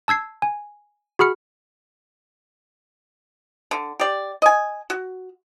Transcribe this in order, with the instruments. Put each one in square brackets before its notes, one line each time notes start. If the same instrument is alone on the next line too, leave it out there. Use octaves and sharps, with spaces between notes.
[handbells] A5 E6 G#6 C7
G#5
F#4 G#4 B5 F6 C#7
[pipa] D3
G4 D5
D#5 G#5
F#4